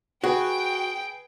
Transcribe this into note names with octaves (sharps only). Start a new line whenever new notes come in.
F#4 G#4 B4 G5 G#5